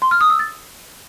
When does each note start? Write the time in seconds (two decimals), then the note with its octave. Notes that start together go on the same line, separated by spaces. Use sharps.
0.02 C6
0.11 F6
0.21 D#6
0.30 E6
0.39 A6